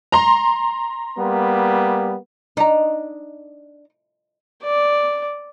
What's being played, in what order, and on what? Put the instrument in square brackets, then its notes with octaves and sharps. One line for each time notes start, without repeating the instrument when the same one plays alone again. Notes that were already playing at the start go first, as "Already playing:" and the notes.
[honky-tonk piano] A#5 C6
[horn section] G3 A#3 B3
[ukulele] D4 A#5 [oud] D#4
[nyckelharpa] D5